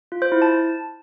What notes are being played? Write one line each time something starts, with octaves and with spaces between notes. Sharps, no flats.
F4
C5
E4
A5